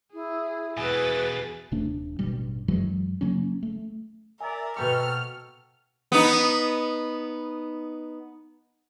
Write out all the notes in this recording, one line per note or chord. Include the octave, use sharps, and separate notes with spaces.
E4 G#4
E2 B2 G#4 B4 A6
D#1 C3 A3 D4
A1 G2 B2 G3
F#2 E3 F#3 G#3
C#3 F#3 A#3 C#4
A3
A#4 D5 E5 G#5 A#5
B2 B3 F#4 A4 G5 C#6 F6
B3 D#4